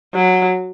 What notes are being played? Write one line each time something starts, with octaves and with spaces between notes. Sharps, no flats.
F#3